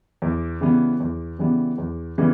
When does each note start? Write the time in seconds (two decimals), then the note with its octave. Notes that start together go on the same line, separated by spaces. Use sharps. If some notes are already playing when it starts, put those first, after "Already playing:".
0.22 E2
0.61 C#3 E3 G3 B3
1.00 E2
1.39 C#3 E3 G3 B3
1.78 E2
2.18 C#3 E3 G3 B3